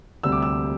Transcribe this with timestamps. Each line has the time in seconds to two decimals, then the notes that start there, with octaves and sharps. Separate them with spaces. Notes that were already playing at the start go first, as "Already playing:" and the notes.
0.23 D2 C3 G3 E6
0.32 D6
0.42 E6